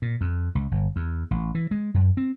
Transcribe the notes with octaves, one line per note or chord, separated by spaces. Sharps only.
A#2
F2
C#2
G1
E2
A1
E3
G#3
F#2
C4